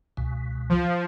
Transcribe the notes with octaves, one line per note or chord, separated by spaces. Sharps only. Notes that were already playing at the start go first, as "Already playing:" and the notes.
C#2 B2
F3